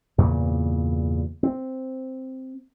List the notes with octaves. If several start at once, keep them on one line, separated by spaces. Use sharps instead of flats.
E2 G2 A#2 C#3
C4